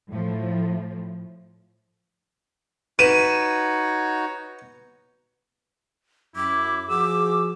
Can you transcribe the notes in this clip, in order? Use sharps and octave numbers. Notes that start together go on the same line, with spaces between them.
A2 F3
D#4 F#4 B4 C#5 D#7 E7
F#2 E4 D6
F3 F#4 G#4 D6 E6